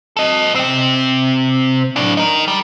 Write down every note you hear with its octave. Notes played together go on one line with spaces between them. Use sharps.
A4 D#5
C3 C4
A2 D4
D#4 A#4
G3